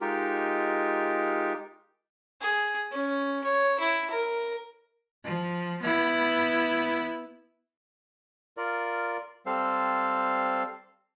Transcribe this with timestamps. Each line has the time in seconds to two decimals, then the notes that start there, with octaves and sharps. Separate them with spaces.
0.01 G#3 D#4 F4 G4 A#4
2.41 G#4
2.92 C#4
3.44 C#5
3.79 E4
4.11 A#4
5.24 F3
5.82 B3 E4
8.57 F4 A#4 D5
9.46 G3 C4 A4 C5 F5